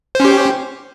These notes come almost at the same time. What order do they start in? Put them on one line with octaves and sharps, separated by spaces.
C5 C#4 G4